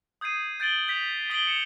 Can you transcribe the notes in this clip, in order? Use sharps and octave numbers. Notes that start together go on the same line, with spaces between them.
D#6 G6 G#6 C7 D#7
G6 A6 D7 F#7 G7
G6 B6 F7
D#6 B6 D7 F#7 G7
C#7 E7 F7